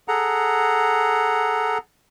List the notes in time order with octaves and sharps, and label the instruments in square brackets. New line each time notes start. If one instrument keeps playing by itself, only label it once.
[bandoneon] G#4 A4 F#5 A#5